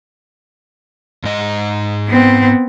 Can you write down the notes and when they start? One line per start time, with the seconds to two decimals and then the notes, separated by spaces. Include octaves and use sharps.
1.24 G#2 G#3 D#5
2.08 B3 C4